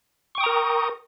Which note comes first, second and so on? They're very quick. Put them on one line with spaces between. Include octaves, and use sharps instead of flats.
C#6 G5 D#6 A#5 A#4